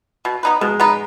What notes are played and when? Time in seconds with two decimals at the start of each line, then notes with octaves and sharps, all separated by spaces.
0.25 B2
0.43 B3 D#4 B4
0.61 B2 G#3
0.80 B3 D#4 B4